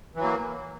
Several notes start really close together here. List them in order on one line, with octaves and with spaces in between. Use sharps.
E3 F#3 A#3